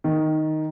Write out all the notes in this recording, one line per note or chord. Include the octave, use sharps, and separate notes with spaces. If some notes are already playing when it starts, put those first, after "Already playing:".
D#3